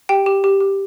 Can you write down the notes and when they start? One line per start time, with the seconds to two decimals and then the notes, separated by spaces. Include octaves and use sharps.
0.09 G4 G5
0.26 G4
0.44 G4
0.60 G4